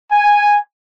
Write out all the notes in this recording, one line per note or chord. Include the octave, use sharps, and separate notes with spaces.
G#5